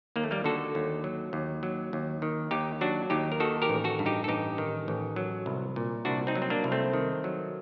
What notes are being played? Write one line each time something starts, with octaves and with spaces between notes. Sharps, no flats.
D#2 A#3
A3
G3 A#3
D3 F#4 A4
D#2
F#3
D#2
F#3
D#2
D#3
D#2 D#4 G4
F#3 D4 F#4
D#2 D#4 G4
A#4
D#3 F#4 A4
G4 A#4
A1
F#4 A4
G2
D#4 G4
A4
A1 D#4 G4
D#3
A1
F#3
C2
A#2
C2 D4 F#4
C4 D#4
F#3
C4
A#3 D4
C2
A3 C4
D#3
F#3